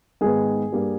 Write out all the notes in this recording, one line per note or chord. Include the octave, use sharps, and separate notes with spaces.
G#2 D#3 G#3 B3 G#4
G2 G3 A#3